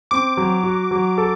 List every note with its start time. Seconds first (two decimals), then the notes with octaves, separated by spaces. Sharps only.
0.11 C4 D6
0.37 F#3
0.63 F#4
0.91 F#3
1.18 A4